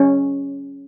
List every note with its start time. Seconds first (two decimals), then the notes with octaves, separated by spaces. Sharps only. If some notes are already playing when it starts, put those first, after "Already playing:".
Already playing: C#4